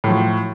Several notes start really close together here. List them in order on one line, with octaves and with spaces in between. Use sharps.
A2 F#3 F3